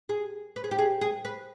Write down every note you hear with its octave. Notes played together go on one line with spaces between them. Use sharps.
G#4
B4
G#4
G4
G#4
G#4
B4